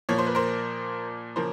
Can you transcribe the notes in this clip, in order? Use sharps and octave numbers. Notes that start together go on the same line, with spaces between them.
A#2 F3 A#3 C#5
C5
B4
A#4 C5
C#3 F3 A#3 A#4 C5